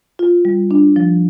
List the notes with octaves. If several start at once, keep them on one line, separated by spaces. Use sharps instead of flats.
F4
G3
D4
F3